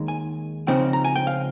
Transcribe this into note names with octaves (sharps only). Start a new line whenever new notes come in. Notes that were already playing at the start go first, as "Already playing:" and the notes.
Already playing: D#2 D#3 G#3 D#4
G#5
C#2 C#3 F3 C4 D#4 G5
A#5
G#5
G5
F5